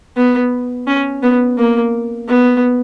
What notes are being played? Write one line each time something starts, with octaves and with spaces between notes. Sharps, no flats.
B3
C#4
B3
A#3
B3